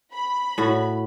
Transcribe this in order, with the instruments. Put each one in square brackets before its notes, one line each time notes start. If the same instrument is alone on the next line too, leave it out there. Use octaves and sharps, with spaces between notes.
[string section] B5
[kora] A2 F#4